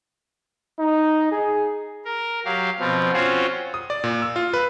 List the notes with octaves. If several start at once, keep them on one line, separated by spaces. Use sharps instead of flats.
D#4
G#4
A#4
F#3 G4 F5
B2 F3 C4
C4 C#4 F4 F#4 C5 C#5
D#6
D5
A#2
E6
F4
B4